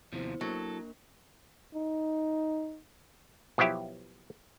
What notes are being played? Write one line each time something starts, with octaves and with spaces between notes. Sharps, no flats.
D#2 C3 F3 B3 E4 C5
F#3 A#3 D4 A4 A#4
D#4
B2 F3 F#3 E4 G4